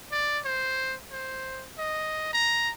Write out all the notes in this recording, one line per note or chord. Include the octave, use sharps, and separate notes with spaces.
D5
C5
C5
D#5
A#5